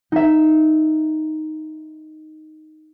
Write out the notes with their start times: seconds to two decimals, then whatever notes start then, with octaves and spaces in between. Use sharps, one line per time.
0.12 D#4 E5